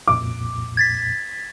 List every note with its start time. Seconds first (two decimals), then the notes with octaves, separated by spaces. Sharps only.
0.08 C2 F2 A#2 D6
0.77 G#6 A6 B6